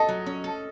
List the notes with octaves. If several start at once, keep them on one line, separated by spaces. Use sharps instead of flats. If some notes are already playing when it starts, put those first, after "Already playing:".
Already playing: A4 D#5
F#3
C#4
A4